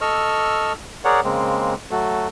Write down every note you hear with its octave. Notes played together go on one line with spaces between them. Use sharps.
A4 D#5 C#6 E6 F6
G#4 A#4 C#5 D5 F#5
C#3 G#3 A#3 C4
F#3 A3 F#4 A4